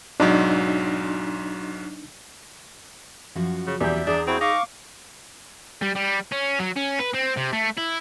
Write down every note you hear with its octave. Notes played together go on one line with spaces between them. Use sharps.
B1 G#2 F#3 D4 D#4
F#2 F3 F#4
C#3
E2 G3 E5 G6
D4 G#4 A#5
C4 E4 F#4 G5
D#4 F5 C#6 D6
G3
G3
C#4
F#3
C#4
B4
C4
C3
A3
E4